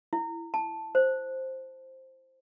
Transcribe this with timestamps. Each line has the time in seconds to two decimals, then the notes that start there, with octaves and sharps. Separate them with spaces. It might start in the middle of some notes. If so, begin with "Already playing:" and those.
0.13 E4
0.54 A5
0.95 C5